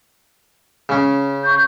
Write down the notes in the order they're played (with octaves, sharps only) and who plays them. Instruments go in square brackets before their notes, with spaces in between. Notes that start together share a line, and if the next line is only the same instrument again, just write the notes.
[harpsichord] C#3 C#4
[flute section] C#6 G6